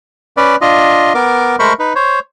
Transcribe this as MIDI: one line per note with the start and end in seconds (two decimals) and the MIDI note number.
0.37 0.56 61
0.37 0.56 71
0.37 0.56 74
0.61 1.13 62
0.61 1.13 65
0.61 1.13 75
1.14 1.56 59
1.14 1.56 70
1.14 1.56 86
1.59 1.73 56
1.59 1.73 57
1.59 1.73 70
1.59 1.73 72
1.59 1.73 83
1.59 1.73 85
1.79 1.93 63
1.79 1.93 71
1.95 2.19 72
1.95 2.19 73